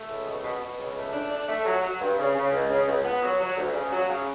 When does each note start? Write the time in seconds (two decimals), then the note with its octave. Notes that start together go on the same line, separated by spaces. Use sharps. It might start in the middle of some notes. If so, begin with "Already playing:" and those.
Already playing: A3
0.09 C#2
0.25 B2
0.44 B2
0.61 B2
0.78 C#2
0.96 A3
1.13 D4
1.31 D4
1.49 A3
1.65 F#3
1.83 F#3
2.00 G2
2.19 C#3
2.35 C#3
2.52 C#2
2.70 C#3
2.88 C#2
3.05 B3
3.22 F#3
3.41 F#3
3.57 D2
3.74 C#3
3.92 F#3
4.09 C#3